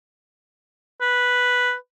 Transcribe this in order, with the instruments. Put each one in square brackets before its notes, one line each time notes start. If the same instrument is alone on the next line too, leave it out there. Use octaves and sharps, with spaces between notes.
[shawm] B4